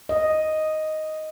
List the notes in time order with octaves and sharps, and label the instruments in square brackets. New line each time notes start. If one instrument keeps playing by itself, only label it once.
[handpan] D#5